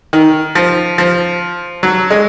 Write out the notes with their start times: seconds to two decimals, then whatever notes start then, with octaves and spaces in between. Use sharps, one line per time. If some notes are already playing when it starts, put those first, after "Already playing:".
0.13 D#3
0.55 F3
0.98 F3
1.83 F#3
2.10 G#3